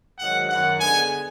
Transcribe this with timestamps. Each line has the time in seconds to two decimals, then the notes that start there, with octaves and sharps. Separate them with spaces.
0.19 G#2 D#3 F#3 F#5
0.49 F#2 D#3 F#3 F#5
0.80 D3 G#3 B3 G#5